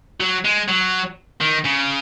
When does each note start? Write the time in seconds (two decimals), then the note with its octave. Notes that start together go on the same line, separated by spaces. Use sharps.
0.20 F#3
0.45 G#3
0.68 F#3
1.41 D#3
1.64 C#3